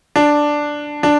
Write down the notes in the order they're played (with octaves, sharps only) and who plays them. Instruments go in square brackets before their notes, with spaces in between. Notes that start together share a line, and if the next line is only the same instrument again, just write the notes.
[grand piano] D4
D4